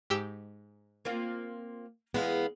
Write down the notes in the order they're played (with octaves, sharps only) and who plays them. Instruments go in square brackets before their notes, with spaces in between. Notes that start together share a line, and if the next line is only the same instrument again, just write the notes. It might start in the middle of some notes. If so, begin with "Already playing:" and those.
[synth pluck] G#2 G4 E6
[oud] A#3 C4 F4
[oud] E2 G#3 E4 [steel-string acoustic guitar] B3 F5